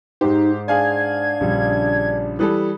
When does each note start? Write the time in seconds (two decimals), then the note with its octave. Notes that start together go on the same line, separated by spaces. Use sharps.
0.21 G#2 D#4 G4 C5
0.68 D4 G#4 F5 G#5 G#6
1.40 A#1 C#3 G3
2.39 E3 G3 A4 B5 D#6 F#6